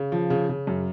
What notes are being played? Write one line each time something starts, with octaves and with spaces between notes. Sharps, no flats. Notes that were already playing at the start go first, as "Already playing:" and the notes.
Already playing: C#3
F3
C#3
C#3
F#2